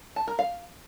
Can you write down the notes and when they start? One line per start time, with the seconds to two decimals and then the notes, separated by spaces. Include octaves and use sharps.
0.16 A5
0.27 A#4
0.39 F5